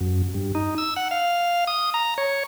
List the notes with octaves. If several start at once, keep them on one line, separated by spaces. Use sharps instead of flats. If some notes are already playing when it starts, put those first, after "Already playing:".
F#2
G2
D#4
E6
F#5
F5
D#6
A#5
C#5